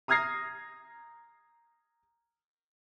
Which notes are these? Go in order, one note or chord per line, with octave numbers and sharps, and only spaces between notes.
A#5 D#6 F6 G#6 A#6 C7